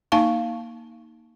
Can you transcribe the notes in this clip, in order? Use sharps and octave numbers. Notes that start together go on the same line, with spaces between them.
A#3 D#4 F5 A5 C#6